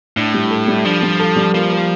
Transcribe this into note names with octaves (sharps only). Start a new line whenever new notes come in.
A2 D4
G3
A4
G3
F3 D4
G3
A4
G3
F3 A#3
A#4